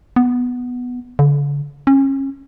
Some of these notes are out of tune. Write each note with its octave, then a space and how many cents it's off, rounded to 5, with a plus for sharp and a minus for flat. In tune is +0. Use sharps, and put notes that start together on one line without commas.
B3 +0
D3 -40
C#4 -30